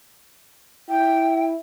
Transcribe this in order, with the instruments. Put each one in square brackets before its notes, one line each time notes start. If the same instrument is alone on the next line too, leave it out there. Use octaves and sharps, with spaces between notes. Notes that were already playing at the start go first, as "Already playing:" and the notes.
[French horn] E4 [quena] G5